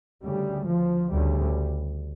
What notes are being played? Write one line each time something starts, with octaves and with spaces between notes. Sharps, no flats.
D2 C#3 G3
F3
D2 C#3 G3